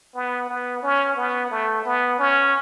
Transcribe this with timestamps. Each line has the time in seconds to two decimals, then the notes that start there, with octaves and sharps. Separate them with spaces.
0.15 B3
0.49 B3
0.83 C#4
1.17 B3
1.51 A3
1.85 B3
2.19 C#4